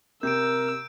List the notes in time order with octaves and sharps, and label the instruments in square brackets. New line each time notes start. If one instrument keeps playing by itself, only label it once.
[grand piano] C3 G4 [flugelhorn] A#4 [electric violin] E6 [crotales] G6 D7